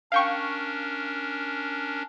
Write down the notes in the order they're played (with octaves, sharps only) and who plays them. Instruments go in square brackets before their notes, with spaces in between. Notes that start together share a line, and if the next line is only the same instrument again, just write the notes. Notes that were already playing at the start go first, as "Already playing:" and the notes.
[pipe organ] C#4 D4 A#4 [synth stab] F5 G5 C#6